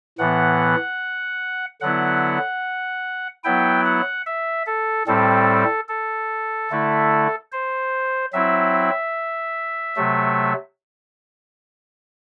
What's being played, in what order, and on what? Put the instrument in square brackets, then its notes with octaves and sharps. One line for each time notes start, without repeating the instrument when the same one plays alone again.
[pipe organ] A2 E3 B3 F#5
D3 F#3 B3 E4 F#5
F#3 B3 E4 G5
F#5
E5
A4
A2 G3 C4 A4
A4
D3 A3 E4
C5
F#3 C4 E4 E5
C3 F#3 A3